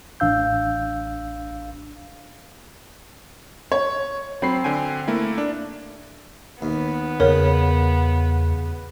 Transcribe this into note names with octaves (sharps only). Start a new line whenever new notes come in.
A1 D4 F5 E6 G6
C#5
F#3 C4 B5 C7
D3 G5 G#5
A3 A#3 E4
D4
D#2 B3
E2 C#3 A#4 C#5